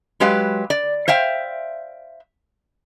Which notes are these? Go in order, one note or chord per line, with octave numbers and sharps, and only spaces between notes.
F#3 G#3 G4 B4 F5
D5
C5 E5 F5 G5